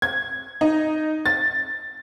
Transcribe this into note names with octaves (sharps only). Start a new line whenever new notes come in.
G#6
D#4
A6